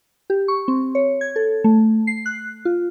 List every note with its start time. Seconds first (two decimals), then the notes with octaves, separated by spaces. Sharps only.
0.30 G4
0.48 C#6
0.68 C4
0.95 C#5
1.21 G#6
1.36 A4
1.64 A3
2.07 C7
2.26 F#6
2.65 F4